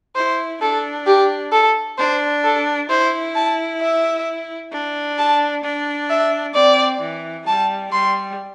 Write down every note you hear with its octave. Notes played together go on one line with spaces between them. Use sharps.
E4 C5
D4 A4
G4
A4
D4 C5
A4
E4 C5
A5
E5
D4
A5
D4
E5
C4 D5
E3
G3 A5
G3 C6